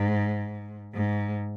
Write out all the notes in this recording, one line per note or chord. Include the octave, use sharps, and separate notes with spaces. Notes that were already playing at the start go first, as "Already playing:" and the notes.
Already playing: G#2
G#2